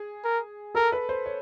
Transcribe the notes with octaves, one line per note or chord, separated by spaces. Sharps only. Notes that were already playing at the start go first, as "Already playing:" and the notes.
Already playing: G#4
A#4
A4 A#4
B4
C5
C#5